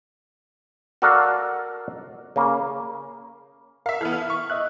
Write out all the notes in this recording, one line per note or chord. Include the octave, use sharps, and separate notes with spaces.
F#4 A4 A#4 D5 F5 F#5
C#3 A#3
A#4 E5 F5
E3 B3 A4 F6
E4 F6
C#6
D#5 E5 F#6